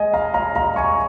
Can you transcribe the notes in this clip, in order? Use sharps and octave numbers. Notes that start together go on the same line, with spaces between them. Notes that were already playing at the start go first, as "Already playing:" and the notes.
Already playing: G#3 D#5 G#5
F5 A#5
F5 A#5
F5 A#5
G#5 C#6